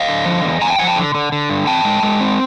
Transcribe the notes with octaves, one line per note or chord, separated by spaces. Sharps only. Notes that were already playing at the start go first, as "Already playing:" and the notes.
Already playing: D#5 F5
D3
F3
E2
E2 G#5 A#5
G5 A5
F3 F#5 G#5
G5 A5
D3
D3
D3
G2
C4 G5 A5
G#3
G#3
C4